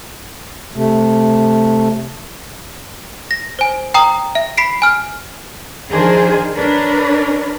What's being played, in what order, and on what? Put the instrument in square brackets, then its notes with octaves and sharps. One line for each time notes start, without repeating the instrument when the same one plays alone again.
[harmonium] C3 A3
[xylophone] A#6
C5 G#5
G5 A#5 D#6
E5
B5 B6 C7 D7
G#5 F6
[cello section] D#3 F3 D4 G#4 A#4 C5
D4 A#4 B4 C#5